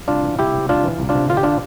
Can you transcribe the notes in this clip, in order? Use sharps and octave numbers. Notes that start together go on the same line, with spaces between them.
C2 D4 F4
E3
C2 E4 G4
C3
C2 D4 F4
E3
C2
D4 F4
C3
D3 F4
G4
D4 F4